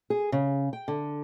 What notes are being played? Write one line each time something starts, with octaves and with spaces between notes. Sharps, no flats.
G#4
C#3
G5
D3